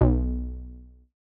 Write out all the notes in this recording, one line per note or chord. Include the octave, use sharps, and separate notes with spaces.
B1